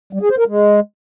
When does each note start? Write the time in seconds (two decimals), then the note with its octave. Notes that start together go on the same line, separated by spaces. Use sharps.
0.13 G3
0.21 G#4
0.30 C5
0.38 A#4
0.47 G#3